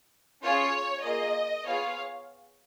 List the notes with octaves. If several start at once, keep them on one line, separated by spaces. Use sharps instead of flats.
C#4 F4 G#4 C#5
A#3 F4 G#4 D#5
B3 F4 G#4 C#5 F5